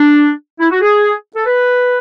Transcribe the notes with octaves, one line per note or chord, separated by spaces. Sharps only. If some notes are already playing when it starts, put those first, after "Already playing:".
Already playing: D4
E4
F#4
G#4
A4
B4